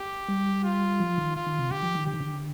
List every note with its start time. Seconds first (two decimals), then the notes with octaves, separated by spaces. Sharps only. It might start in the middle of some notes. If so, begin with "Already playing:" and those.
Already playing: G4
0.28 G3
0.64 F4
1.00 F3
1.18 D#3
1.36 F4
1.47 D#3
1.59 C3
1.71 D3 G4
1.83 F3
1.95 D#3
2.07 D3 G4
2.14 D#3
2.20 D3